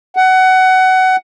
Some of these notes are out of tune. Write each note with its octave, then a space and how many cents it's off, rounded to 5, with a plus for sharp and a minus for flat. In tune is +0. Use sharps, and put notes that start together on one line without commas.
F#5 +20